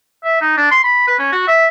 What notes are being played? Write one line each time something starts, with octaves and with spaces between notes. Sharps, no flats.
E5
D#4
D4
C6
B5
B4
C#4
F#4
E5